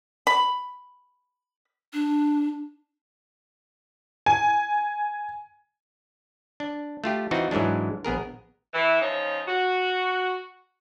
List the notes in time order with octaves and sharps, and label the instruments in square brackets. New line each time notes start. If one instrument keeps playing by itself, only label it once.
[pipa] B5
[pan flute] D4
[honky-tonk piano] G#5
[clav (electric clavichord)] D4
A3 F4 G4
E3 C4 D#4 F4 F#4
G#2 E3 F#3 G#3 D4
A#1 B3 G#4 A#4
[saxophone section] E3
C#3 F3 D#4 C#5
F#4